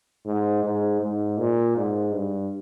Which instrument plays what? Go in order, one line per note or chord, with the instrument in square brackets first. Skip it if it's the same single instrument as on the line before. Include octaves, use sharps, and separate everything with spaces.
[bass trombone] G#2
G#2
G#2
A#2
G#2
G2